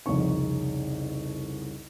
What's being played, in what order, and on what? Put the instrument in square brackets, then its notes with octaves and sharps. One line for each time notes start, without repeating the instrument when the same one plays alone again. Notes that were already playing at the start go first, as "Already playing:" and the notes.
[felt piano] C2 F2 C#3 C#4 D#4 C#6